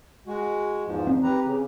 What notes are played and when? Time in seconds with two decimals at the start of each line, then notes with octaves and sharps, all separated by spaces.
0.27 G#3 F#4
0.86 E2 G#2 F3
1.07 C4
1.23 G4 B4 A#5
1.45 C#3